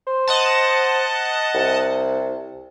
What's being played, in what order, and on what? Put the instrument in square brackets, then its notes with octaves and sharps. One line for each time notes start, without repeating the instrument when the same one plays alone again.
[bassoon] C5
[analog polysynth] D#5 F#5 A5
[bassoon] C2